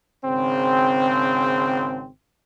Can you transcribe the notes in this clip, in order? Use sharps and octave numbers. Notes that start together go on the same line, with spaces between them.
G#1 C#3 C4